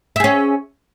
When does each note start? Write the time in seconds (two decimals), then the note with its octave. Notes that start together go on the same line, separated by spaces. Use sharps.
0.16 E5
0.20 G#4
0.24 C#4